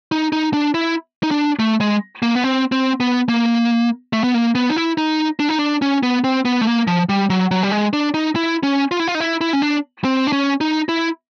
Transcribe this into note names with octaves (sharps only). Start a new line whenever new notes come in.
D#4
D#4
D4
E4
D#4
D4
A3
G#3
A#3
B3
C4
C4
B3
A#3
A3
B3
A#3
B3
D#4
E4
D#4
D4
D#4
D4
C#4
B3
C4
B3
A3
A#3
F3
G3
F#3
F#3
G3
G#3
D4
D#4
E4
C#4
F4
E4
F4
D#4
E4
E4
C#4
D4
C4
D4
C#4
D#4
E4